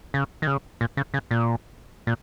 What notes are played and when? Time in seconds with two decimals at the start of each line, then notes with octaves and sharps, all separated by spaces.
0.14 C#3
0.42 D#3
0.47 C#3
0.81 A#2
0.97 C#3
1.14 C#3
1.31 A#2
2.07 A#2